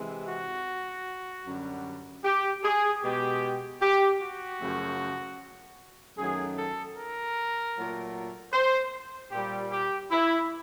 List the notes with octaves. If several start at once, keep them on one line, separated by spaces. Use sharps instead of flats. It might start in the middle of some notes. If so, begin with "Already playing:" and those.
Already playing: C3 E3 G#3
F#4
F#2 D3 G3
G4
G#4
B2 G#3 G4
G4
F#4
F#2 C#3 F3 A3
F#2 D#3 F#3 A3 G#4
A4
A#4
A#2 F#3 A3
C5
A#2 G3 G4
G4
E4